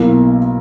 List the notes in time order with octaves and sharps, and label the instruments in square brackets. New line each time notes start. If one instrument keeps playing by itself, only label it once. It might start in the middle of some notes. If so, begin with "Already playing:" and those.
Already playing: [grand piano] B1 B2 A#3 E4